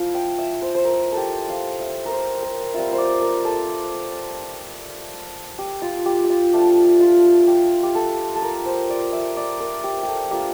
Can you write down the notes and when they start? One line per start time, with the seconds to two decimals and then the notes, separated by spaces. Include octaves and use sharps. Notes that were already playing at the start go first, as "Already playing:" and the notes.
Already playing: F3 E4 F5
0.15 G5
0.38 E5
0.62 C5
0.75 C5
0.85 A#4
1.12 A4
1.17 G4
1.49 F5
1.80 E5
2.06 A#4
2.11 C5
2.43 A#4
2.74 G3 C4 F4 E5
2.93 C5
2.98 D5
3.22 A#4
3.45 A4
5.59 G4
5.82 F4
6.06 G4
6.24 G4
6.30 F4
6.53 F3 A3 D4 F4 G4
7.00 F4
7.47 G4
7.83 G4
7.95 A4
8.35 A4
8.42 A#4
8.66 C5
8.90 D5
9.13 E5
9.37 D5
9.60 A#4
9.84 G4
10.03 G4
10.08 A4
10.31 A#3 D4 F4 G4